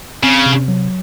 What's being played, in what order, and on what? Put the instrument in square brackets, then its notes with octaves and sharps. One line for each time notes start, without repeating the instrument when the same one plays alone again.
[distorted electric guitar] C#3 [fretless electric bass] C4
[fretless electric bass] C3
F#3